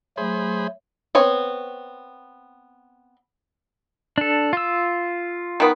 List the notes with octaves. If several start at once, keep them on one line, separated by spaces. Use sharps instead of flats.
F#3 A3 G#4 C5 B5
B3 C4 C#5
D4 A4
F4 E6
D#3 B3